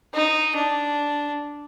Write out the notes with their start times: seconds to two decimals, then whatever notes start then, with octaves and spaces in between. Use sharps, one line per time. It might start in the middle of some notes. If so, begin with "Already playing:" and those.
0.14 D#4
0.56 D4